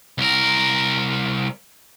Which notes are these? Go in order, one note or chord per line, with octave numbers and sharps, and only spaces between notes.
C2 A#4